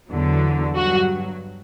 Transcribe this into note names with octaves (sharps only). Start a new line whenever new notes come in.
E2 D3 F#3
G2 F#3 F#4